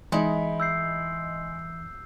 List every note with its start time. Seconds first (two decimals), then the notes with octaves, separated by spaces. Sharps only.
0.12 E3 G#3 D#4 E4
0.60 E6 G6 C7